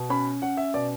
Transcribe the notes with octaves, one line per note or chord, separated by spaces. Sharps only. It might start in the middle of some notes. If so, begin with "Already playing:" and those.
Already playing: B2
C#4 B5
C#4 F#5
E5
B2 D5